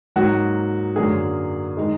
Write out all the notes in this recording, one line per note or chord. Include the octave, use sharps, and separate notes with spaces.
G#2 F#3 A#3 F#4
F#2 D3 F#3 A#3 G#4
D#3 G#3